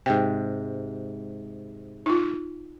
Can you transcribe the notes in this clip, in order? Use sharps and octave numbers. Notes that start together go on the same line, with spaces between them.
G#2 C3 G5
D#4 F4